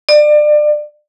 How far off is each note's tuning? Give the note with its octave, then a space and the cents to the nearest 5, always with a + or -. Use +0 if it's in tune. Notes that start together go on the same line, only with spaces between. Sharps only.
D5 +30